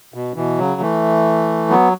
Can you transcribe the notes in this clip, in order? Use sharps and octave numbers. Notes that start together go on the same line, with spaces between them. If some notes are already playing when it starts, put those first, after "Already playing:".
B2
B2 E3
C#3 F#3
E3 A3
F#3 B3